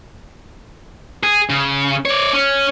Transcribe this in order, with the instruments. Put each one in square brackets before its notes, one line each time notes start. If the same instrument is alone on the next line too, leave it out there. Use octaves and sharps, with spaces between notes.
[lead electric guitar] G#4
C#3
C#5 D5
C#4